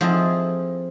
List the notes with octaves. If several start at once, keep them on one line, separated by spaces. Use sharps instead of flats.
F3 C4 E4 G#4 A4 D#5